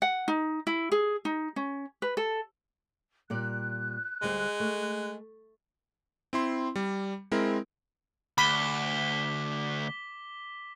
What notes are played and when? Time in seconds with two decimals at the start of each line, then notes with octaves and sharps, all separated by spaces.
0.02 F#5
0.28 D#4
0.67 E4
0.92 G#4
1.25 D#4
1.56 C#4
2.02 B4
2.17 A4
3.30 A#2 G3 D5 F#6
4.22 D2 G3 G#3 C5
4.60 A3
6.33 C4 E4 C6
6.76 G3
7.32 G#3 C4 E4 A#4
8.38 D2 B5 D6 B6 G7